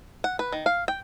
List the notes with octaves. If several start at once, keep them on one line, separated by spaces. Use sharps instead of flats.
F#5
B4
D#3
F5
G5